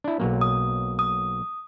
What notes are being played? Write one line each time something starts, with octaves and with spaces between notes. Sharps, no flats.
D4 E4
B1 F#3 A#3
D#6
D#6